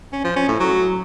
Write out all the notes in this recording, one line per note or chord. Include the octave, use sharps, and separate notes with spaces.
C#4
F3
C#4
A2
F#3